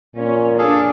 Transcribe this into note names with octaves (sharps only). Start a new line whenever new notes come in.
A#2 C#4
D4 G#4 A4 F5